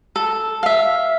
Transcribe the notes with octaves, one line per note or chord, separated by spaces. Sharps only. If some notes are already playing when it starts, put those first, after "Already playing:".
A4
E5 F5